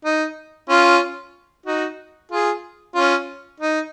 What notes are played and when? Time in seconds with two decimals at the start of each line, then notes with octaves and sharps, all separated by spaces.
0.05 D#4
0.69 C#4 F4
1.66 D#4 F#4
2.32 F4 G#4
2.95 C#4 F4
3.60 D#4